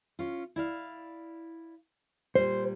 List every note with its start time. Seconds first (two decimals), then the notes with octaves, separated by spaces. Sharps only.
0.19 C#4 F4
0.56 E4 D5 F5
2.35 A#2 G3 C5